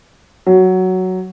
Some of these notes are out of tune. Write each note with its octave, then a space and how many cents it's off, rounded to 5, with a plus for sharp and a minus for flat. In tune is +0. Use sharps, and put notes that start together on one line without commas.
F#3 +5